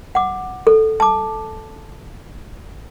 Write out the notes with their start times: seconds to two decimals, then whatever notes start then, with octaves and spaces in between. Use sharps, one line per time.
0.15 F#5 D6
0.67 A4
1.00 A5 D6